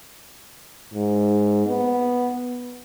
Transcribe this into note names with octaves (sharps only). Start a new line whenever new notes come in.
G#2
B3